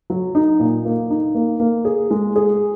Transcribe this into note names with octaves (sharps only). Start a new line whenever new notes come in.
F#3
D#4
A#2
A#3
D#4
A#3
A#3
G#4
G#3
G#4